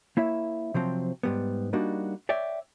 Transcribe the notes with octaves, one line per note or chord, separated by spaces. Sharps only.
A#3 E4 C#5 E5
C3 F3 F#3 C4
G#2 G3 B3
G3 A#3 D4 D#4 F#4
C#5 D5 E5 G5